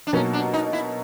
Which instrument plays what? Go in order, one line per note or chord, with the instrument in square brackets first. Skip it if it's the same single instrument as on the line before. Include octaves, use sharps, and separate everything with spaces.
[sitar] D4
[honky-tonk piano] B2 F#3 A#3 D#4 [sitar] C#4
[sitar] D4
D#4
E4